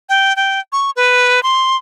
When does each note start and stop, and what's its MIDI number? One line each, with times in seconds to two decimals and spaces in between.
0.09 0.36 79
0.36 0.60 79
0.72 0.91 85
0.96 1.43 71
1.43 1.77 84